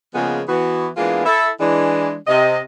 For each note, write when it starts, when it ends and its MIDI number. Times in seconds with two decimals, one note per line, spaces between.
0.15 0.41 49
0.15 0.41 53
0.15 0.41 56
0.15 0.41 58
0.15 0.41 59
0.48 0.88 52
0.48 0.88 59
0.48 0.88 66
0.97 1.22 52
0.97 1.22 56
0.97 1.22 58
0.97 1.22 59
0.97 1.22 62
0.97 1.22 65
1.26 1.49 64
1.26 1.49 69
1.26 1.49 76
1.61 2.15 52
1.61 2.15 56
1.61 2.15 62
2.28 2.59 48
2.28 2.59 75